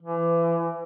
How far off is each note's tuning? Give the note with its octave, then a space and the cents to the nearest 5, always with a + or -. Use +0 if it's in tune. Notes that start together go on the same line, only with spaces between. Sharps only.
E3 +30